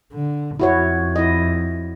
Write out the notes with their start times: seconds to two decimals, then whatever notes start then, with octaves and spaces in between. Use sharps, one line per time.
0.13 D3
0.60 F2 E4 F#4 C#5
1.16 E4 D#5